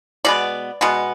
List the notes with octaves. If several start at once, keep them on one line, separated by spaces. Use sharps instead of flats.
B2 G#3 B3 D5
B2 G#3 B3